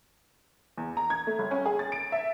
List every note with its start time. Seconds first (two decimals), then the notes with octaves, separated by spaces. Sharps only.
0.78 E2
0.97 A#5
1.10 G#6
1.27 A3
1.39 G1
1.51 C#4
1.66 G#4
1.79 A6
1.92 D7
2.12 E5